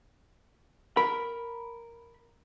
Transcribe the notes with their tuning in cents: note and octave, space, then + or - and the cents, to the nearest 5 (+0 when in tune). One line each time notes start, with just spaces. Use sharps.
A#4 +0 B5 +0